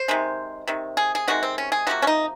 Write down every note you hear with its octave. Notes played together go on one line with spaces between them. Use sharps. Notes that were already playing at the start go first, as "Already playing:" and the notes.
Already playing: C5
C3 D#3 G#3
C3 D#3
G#4
G#4
C3 D#3 G#3 F#4
C4
C#4
G#4
C3 F3 A#3 F#4
C#4
D#4